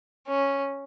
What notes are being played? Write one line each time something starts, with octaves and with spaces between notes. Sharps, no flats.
C#4